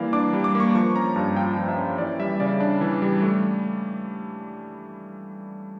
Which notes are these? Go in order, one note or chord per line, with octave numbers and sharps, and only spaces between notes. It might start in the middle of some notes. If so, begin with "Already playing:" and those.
Already playing: E3 G3 A#3 D5 F5
D4 D6
G3
D6
A#3
C#6
F3 C#6
C#4 A#5
G2 A5
F4 G5
F3
E5
C#4
E3 D5
G3 E5
C#3 D5
D4
E3
G3
A3